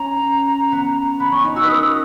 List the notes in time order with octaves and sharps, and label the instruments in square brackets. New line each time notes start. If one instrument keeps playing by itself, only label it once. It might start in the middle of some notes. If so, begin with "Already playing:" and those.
Already playing: [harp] C#4 [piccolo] A#5
[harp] B3
[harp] B3 [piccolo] B5
[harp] C#4 [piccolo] C#6
[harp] D#4
[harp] F#4 [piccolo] E6
[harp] B4
[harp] A#4 [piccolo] D#6
[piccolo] D#6